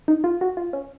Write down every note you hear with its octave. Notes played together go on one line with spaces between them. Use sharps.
D#4
F4
F#4
F4
C#4